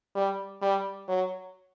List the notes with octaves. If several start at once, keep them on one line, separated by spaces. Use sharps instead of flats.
G3
G3
F#3